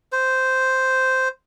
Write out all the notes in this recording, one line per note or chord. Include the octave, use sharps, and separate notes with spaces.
C5